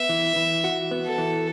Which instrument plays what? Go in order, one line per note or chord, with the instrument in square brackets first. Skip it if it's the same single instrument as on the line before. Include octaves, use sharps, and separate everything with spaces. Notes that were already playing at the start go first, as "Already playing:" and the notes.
Already playing: [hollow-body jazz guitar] B3 [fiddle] E5
[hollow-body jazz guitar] E3
E3
F#4
B3
[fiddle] A4
[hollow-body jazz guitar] E3